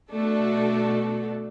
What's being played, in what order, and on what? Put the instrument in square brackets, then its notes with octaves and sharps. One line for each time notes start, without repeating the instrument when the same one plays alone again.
[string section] B2 A3 D4 F#4 A4